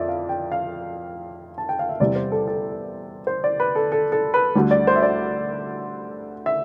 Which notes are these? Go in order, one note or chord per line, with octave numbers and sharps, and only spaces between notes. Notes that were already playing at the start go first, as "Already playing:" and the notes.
Already playing: F2 D5 E5
F5
G5
F5
A5
G5
F5
E5
E2 C3 G3 D5
C5
A4
A4
C5
D5
B4
A4
A4
A4
B4
D2 D3 G3
D5
C5
E5
D5
E5